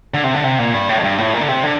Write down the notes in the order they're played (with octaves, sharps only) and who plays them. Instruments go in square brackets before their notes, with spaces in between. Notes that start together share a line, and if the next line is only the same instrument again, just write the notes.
[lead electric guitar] D3
C3
D3
C3
A#2
G2
A2
F2
G2
A2
A#2
D3
C3
D3